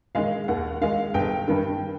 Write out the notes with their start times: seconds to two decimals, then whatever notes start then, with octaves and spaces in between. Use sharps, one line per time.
0.15 D#3 G#3 F5
0.48 D#2 F#5
0.81 D#3 G#3 F5
1.14 G1 G5
1.48 G2 D#3